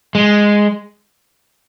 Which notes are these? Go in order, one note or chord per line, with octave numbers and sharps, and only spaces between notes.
G#3